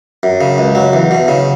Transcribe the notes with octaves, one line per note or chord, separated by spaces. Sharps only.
F#2
C#3
C#2
F#3
E2
B2
C#3